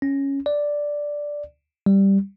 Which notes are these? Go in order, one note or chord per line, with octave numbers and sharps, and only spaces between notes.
C#4
D5
G3